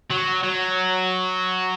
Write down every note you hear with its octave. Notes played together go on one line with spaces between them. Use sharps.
F#3
F#3